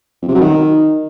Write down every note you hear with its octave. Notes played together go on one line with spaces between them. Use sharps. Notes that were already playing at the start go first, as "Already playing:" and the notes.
F2
C3
F#3
D#3